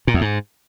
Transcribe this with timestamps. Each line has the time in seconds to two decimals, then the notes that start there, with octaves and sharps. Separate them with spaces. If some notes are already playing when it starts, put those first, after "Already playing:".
0.07 A#2
0.14 E2
0.21 G#2